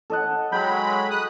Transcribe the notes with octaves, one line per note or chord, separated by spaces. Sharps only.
A4 D#5 F#5
F#3 G#3 G5 B5
D#6 F#6